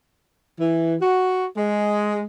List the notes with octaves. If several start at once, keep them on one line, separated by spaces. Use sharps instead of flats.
E3
F#4
G#3